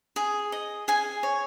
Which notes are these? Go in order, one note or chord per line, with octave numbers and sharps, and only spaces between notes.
G#4
D#5
G#4 G#5
C#5